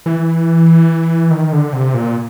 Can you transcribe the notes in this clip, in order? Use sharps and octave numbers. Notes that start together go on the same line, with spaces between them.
E3
D#3
D3
C3
A#2